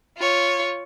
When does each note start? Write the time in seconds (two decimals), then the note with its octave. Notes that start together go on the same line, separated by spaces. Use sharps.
0.18 F4 C#5